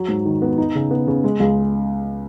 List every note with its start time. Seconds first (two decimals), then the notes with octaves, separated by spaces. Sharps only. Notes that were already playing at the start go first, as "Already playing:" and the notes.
Already playing: F#3
0.08 G#2
0.26 D#3
0.42 B3
0.58 D#4
0.75 C#3
0.91 B3
1.07 C#3
1.24 G#3
1.40 C#2